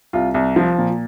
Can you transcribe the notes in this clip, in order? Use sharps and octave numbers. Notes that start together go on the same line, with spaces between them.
C2 F4
C2
F3
A#2